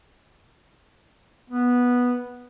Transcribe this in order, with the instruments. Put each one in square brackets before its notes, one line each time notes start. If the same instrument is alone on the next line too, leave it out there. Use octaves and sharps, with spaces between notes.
[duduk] B3